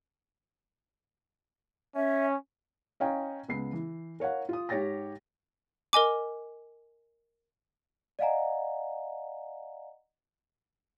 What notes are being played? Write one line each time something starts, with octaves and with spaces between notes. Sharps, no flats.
C#4 E5
C#4 D#5 F5 G5 G#5 A#5
C#2 B3 C7
E3
A#4 C#5 F5 F#5
F4 D#6
G#2 G4 C#5 G5 A6 A#6
A#4 D#5 G#5 D6
D5 D#5 F5 F#5 G#5 A#5